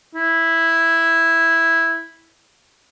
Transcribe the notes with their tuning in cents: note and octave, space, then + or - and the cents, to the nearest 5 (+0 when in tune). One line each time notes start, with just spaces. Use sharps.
E4 +0